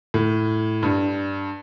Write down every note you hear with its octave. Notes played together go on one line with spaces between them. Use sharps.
A2
G2